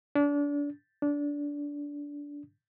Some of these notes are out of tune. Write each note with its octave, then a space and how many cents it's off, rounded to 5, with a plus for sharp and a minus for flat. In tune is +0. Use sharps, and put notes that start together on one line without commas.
D4 -30
D4 -20